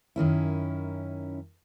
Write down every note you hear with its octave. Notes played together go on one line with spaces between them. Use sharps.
F#2 D#3 C#4 E4